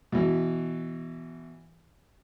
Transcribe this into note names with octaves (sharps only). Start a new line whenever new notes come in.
B2 E3